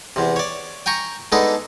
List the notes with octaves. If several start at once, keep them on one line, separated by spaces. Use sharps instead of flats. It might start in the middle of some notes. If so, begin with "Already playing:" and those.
E2 C3
C#5 D5
G5 G#5 A#5 C#6
G#3 B3 D4 D#4 A4